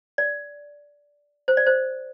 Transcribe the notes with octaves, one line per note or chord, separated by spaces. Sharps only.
D5
C5
D5
C5